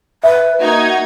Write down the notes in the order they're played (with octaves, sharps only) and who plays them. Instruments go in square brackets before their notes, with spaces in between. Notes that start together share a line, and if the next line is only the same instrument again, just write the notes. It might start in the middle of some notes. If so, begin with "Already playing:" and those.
[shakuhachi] B4 [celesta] E5
[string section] A#3 D#4 G#6 [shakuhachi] F#4